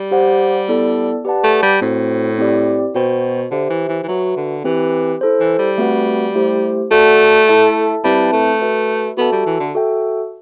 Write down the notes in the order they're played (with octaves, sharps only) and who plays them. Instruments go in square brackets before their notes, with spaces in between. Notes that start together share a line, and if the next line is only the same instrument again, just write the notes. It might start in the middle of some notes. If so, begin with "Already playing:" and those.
Already playing: [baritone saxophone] G3
[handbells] G4 C5 F#5
B3 E4 A4 D5 A5
G4 B4 D5 F#5 A5
[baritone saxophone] A3
G3
[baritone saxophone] A2 [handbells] C4 F#4 C5
[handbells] C4 E4 G4 D5
[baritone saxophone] B2 [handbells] F#4 C5 G5
[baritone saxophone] D3 [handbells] G4 C5 E5
[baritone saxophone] E3
E3
E3
[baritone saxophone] F#3 [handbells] F#4 B4 E5
[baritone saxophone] D3
[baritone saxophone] E3 [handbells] C4 G4 B4
[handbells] E4 A4 C5
[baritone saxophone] E3
G3
[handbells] A3 C4 F#4 B4 F#5
A3 E4 G4 C5
[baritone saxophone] A3 [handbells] F#4 A4 D5 F#5 A5
[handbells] E4 A4 E5 A5
[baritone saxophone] G3 [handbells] C4 E4 B4 E5 A5
[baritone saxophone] A3
[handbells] F#4 B4 E5
[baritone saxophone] B3 [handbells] F#4 A4 E5 A5
[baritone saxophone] G3
E3
D3
[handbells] F#4 A4 E5 G5